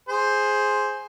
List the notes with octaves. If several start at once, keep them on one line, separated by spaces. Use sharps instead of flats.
G#4 C5